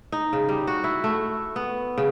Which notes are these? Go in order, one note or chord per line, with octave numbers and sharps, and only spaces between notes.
D#4
C#3
G3
F#4
E4
A3
B3
C#3